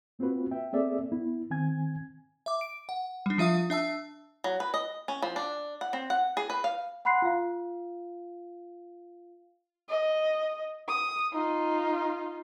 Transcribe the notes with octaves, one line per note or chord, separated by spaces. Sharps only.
A#3 C4 F4 F#4 B4
E5 G5
A#3 C4 G#4 A4 D5 E5
B3 E4
D#3 C4 G#5 G#6
E5 D6
D7
F#5
G3 D4
F3 F4 E5 F5 D#6
D4 E5 A5 E6
F#3
B4
D#5
C#4
F3
D4
F#5
C4
F#5
G#4
B4
F5
F#5 B5 C6 F#6 C7
F4 F5
D#5
D#6
D#4 F4